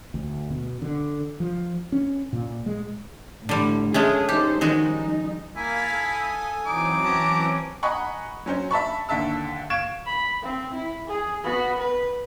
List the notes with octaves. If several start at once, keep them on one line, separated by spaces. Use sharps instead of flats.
D2
B2
D3
F3
C#4
A#2
G#3
A2 D3 G3
G#3 A3 C#4 G#4
D#4 G4 A4 C5
D#3 F3 G3 G#3 D#4 F#4
A#3 E4 F5 G#5 A6 B6
A4 D#6
E3 F#3 C4 D#4 D6
C#4 A5 A#5
D#5 F#5 G#5 A#5 B5 C#6
F#3 C#4 C5
E5 A5 B5 C#6
D#2 D3 E5 A5 E6
F5 C#6 G#6 D7 E7
B5
C4
E4
G#4
B3 F#4
B4